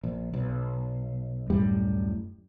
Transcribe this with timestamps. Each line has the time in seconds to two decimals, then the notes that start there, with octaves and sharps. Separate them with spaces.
0.04 A#1
0.33 B1
1.50 D1 F#2 A2 G3